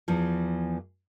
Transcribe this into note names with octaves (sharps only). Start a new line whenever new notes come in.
E2 E3 F3